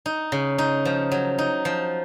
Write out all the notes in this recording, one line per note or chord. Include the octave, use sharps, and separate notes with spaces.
D#4
C#3
D#4
F3
F#3
D#4
F3